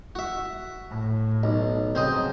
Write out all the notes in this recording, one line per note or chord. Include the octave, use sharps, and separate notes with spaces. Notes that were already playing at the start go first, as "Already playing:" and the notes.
F#4 E5
A2
B1
C#3 F#3 C4 C5 D#5